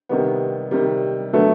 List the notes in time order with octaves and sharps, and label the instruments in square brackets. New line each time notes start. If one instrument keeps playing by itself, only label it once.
[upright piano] C3 D#3 G3 B3
C3 D#3 G3
[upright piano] D3 F#3 B3 [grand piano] A3